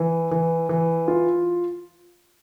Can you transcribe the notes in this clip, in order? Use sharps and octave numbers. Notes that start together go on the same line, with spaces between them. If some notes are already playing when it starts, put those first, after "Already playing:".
Already playing: E3
E3
E3
F4